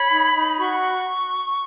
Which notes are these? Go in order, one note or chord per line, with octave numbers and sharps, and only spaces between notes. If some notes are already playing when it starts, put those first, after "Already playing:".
Already playing: C#5 B5
D#4
D#4
F#4 C#6